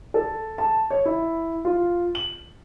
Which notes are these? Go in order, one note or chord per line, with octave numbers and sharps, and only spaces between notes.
A4
A5
C#5
E4
F4
F#7